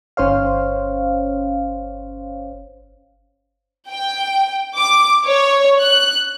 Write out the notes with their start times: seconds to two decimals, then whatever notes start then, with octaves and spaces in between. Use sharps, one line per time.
0.17 G1 C#4 C5 C#5 F5
3.89 G5
4.76 D6
5.26 C#5
5.80 F#6